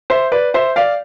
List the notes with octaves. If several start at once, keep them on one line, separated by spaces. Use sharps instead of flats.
C5 E5
B4 D5
C5 E5
D5 F5